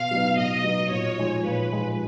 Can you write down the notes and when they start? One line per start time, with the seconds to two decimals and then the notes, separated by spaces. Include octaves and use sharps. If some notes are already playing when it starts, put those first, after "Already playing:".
Already playing: B2 F5
0.11 F#3 B3 D#4
0.38 B2 D#5
0.64 F#3 B3 D#4
0.91 A#2 C#5
1.18 F3 G#3 D#4
1.44 A#2 B4
1.72 F3 G#3 D#4